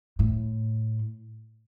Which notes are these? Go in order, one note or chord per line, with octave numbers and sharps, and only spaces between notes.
A2